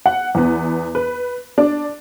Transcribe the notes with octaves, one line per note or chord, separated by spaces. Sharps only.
F#5
E2 B3
B4
D4